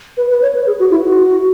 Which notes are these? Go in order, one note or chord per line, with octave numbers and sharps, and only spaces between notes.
B4
B4
C#5
B4
G#4
F#4
E4
F#4